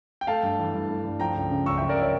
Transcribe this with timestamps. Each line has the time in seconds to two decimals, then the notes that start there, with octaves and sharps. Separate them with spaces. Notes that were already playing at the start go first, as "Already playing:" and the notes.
0.21 G5
0.27 A3 F5 A5
0.43 G2
0.59 E3
0.74 G2
0.89 A3
1.05 G2
1.20 F3 G5 A#5
1.36 C#2
1.51 C#3
1.66 C#2 C#6 E6
1.78 E5 G5
1.81 F3
1.89 A#4 D5
2.01 C#5 E5